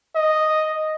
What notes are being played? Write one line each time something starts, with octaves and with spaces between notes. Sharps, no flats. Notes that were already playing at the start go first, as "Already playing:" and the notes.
D#5